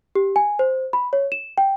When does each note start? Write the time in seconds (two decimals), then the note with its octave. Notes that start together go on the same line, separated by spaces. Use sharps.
0.15 G4
0.36 G#5
0.59 C5
0.93 B5
1.13 C#5
1.32 E7
1.58 G5